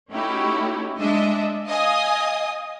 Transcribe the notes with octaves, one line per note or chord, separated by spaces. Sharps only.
A3 C#4 D#4 E4 F#4 G4
G#3 D4 D#5 E5
D#5 F5 G#5 D#6